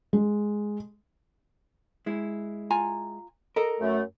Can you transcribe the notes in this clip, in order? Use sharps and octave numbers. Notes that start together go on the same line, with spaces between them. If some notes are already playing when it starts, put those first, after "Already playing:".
G#3
G#3 E4
F4 G#5 A#5
A4 A#4 D#5
F#2 A3